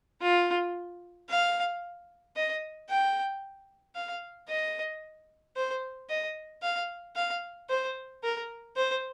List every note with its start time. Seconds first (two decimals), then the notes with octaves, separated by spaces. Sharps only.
0.21 F4
1.29 F5
2.35 D#5
2.89 G5
3.95 F5
4.49 D#5
5.56 C5
6.09 D#5
6.62 F5
7.16 F5
7.70 C5
8.23 A#4
8.76 C5